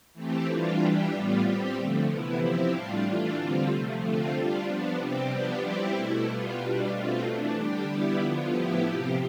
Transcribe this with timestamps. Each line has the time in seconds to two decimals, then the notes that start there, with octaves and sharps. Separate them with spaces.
0.13 E3 A3 C4 G4
0.46 E3 G3 D4 F4
0.78 E3 G3 D4 G4
1.10 A2 G3 B3 F4
1.42 G3 C4 G4
1.74 D3 F3 A3
2.06 C3 E3 B3 E4
2.39 F3 C4 E4 G4
2.70 A2 G3 D4 F4
3.03 E3 A3 D4 F4
3.35 D3 G3 C4 F4
3.67 C3 F3 A3
4.00 D3 A3 C4 F4
4.31 G3 D4 F4
4.64 F3 B3 D4
4.97 C3 G3 C4 G4
5.28 F3 B3 D4 G4
5.61 G3 C4 E4 G4
5.93 B2 A3 E4
6.25 G3 B3 F4
6.57 B2 G3 D4
6.89 B2 A3 C4 F4
7.22 E3 A3 D4
7.54 D3 G3 D4 G4
7.86 G3 B3 E4 G4
8.19 D3 F3 B3 F4
8.51 A2 F3 B3 E4 G4
8.83 C3 F3 C4 G4